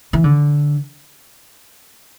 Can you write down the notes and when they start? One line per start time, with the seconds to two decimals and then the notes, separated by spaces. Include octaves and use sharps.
0.13 E3
0.24 D3